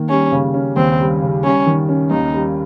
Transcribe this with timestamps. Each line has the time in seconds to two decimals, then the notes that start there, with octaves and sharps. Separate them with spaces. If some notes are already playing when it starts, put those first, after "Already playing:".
Already playing: D#3 A#3
0.09 G3 C#4
0.32 C#3
0.54 C#4
0.77 D#2 C4
0.99 G3
1.21 C#3
1.43 G3 C#4
1.66 D#3
1.89 C#4
2.11 D#2 D#4
2.33 G3